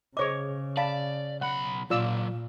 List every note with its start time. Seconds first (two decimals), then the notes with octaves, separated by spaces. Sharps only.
0.17 C#3 G#4 C5 C#5 D#5 D6
0.77 D5 F5 A5 B5
1.41 B1 F#5 B5
1.90 A#2 F#3 A#3 F4 D5 E6